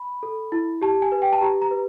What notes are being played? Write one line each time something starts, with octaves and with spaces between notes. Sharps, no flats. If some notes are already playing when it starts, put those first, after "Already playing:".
Already playing: B5
A4
E4
G4 A5
G#5
B4
G5
A5
G4 A#5
A#5
B4